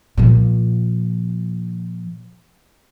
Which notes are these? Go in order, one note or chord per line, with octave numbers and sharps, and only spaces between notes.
A#2 F3